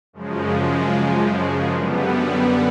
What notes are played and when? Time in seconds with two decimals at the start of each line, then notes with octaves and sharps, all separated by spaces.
0.13 F#2 C#3 F3 G#3
1.71 F#2 D3 G3 B3